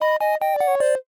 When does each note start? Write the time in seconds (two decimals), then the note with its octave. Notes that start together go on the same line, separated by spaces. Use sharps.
0.01 D#5 B5
0.20 D#5 G#5
0.41 D#5 G5
0.54 D5
0.60 F#5
0.68 C#5
0.80 C5 D5